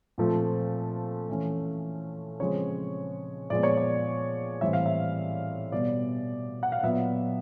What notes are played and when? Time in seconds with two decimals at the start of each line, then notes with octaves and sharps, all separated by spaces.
0.18 A#2 F3 A3 C4
1.29 E3 A3 C#4
2.40 C#3 F3 G#3 C4 C#5
3.50 A#2 F3 G#3 B3 D5
3.63 C#5
3.77 D5
4.61 A2 E3 G3 C4 E5
4.73 F5
4.86 E5
5.72 B2 G3 B3 D5
6.63 F#5
6.72 F5
6.83 A#2 F#3 B3 E5